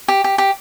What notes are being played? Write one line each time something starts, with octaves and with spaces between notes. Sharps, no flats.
G4
G4
G4